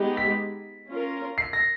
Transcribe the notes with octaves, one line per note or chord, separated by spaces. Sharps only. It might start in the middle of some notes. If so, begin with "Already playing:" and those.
Already playing: G#3 B3 D#4 G4
B6
C#4 F4 A#4
C7
A#6